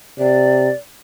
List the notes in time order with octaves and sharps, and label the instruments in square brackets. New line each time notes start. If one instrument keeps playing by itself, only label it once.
[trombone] C3 [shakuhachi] D5